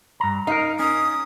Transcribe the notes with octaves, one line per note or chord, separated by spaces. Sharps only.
G2 A#5
D#4 A#4 F5
C#4 D#6